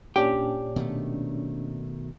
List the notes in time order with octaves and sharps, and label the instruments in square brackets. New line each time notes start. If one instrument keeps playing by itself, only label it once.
[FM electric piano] A#2 C#4 D4 [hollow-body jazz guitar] G4 G5
[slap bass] B2 D#3 A3